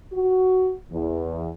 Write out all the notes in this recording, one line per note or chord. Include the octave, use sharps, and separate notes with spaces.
F#4
E2